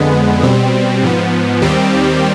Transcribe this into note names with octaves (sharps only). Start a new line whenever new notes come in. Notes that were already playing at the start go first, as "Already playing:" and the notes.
Already playing: F2 D3 G#3 B3
B2 G3 C4
G#2 F3 B3
D#2 D#3 G3 C4 G4